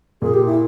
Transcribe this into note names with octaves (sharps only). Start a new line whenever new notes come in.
A#2 G#4
G4
E4